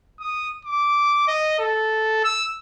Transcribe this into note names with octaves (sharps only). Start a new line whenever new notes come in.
D#6
D6
D#5
A4
E6